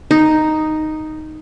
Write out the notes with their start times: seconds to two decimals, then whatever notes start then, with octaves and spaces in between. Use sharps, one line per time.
0.11 D#4